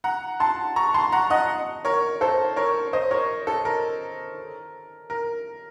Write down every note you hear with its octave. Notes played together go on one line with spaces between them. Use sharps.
F#5 A#5
A5 C6
A#5 C#6
A5 C6
F#5 A#5
D#5 F#5
A#4 C#5
A4 C5
A#4 C#5
C5 D#5
A#4 C#5
A4
A#4
A#4